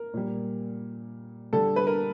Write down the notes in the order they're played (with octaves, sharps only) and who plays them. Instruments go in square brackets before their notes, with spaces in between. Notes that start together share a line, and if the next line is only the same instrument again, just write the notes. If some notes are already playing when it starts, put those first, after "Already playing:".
Already playing: [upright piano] A#4
A#2 G3
D3 G3 A4
B4
A#4